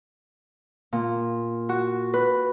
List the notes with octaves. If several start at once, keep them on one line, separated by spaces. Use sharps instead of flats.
A#2
F#4
B4